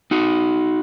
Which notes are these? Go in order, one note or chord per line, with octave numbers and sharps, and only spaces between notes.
D#4 F#4